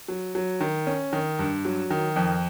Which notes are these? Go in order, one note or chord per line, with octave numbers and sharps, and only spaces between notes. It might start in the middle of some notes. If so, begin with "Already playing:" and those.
F#3
F#3
D#3
C#4
D#3
G2
F#3
D#3
F2